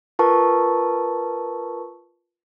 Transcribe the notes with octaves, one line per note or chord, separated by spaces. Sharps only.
F4 A#4 B4 A5 C#6